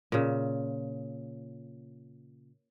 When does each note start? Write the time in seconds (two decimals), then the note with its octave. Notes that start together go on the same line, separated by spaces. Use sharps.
0.12 A#2 C#3